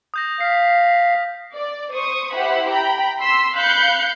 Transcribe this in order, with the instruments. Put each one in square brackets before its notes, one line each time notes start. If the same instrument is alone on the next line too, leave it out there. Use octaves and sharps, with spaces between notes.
[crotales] D#6 G6 A#6
[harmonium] F5 [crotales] B6 C7
[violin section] D5
C5 C#6 D#6
E4 G4 C5 F#5 B5
G5 A#5 B5
C6 E6 B6
F5 B5 F#6 G6 C#7